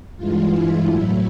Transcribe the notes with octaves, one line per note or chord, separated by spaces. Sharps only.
G2 E3 G#3 F4
E4
A2 F#3 A3 E4